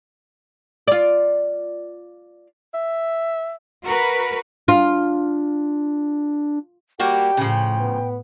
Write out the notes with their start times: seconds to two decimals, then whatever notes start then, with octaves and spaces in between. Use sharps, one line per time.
0.88 F4 D5
2.74 E5
3.84 F#4 A#4 B4
4.68 D4 F4
7.00 G3 A#3 F#4 G4 G5
7.37 A2 C#3 F3
7.79 B3